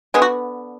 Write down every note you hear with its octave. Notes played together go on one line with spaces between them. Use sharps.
D3 F#3 G#3 B3 G#4
F#4